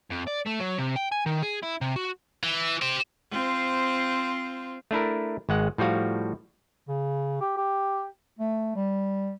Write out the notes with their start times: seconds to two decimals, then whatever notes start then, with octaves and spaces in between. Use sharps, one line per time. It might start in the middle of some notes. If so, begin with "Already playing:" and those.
0.11 F2
0.28 D5
0.47 A3
0.60 F#3
0.79 C3
0.96 G5
1.12 G#5
1.26 D#3
1.42 G#4
1.63 E4
1.81 C3
1.96 F#4
2.44 E3
2.82 G4 C5
3.31 C4 F4 C5
4.91 A3 D4 E4 A#4
5.49 G#1 G#3 F#5
5.78 A2 F3 G3 F#4 F5
6.88 C#3
7.41 G4
7.57 G4
8.39 A3
8.76 G3